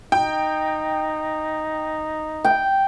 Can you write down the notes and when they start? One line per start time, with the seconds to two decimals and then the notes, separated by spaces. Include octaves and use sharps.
0.12 D#4 G5
2.45 G5